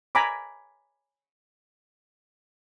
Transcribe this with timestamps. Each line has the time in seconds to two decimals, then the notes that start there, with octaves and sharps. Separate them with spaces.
0.15 G#5 A#5 B5 D6